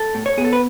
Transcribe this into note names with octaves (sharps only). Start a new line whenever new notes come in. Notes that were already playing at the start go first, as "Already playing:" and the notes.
Already playing: A4
A2
C#5
B3 G#4
A4
B4